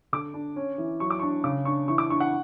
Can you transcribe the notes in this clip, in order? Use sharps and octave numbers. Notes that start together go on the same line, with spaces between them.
D3 D6
D4
C#4
E3
F#3 C#6
D6
D4 C#6
C#3 D6
D4 C#6
E3 C#6
D6
D4 C#6
F#5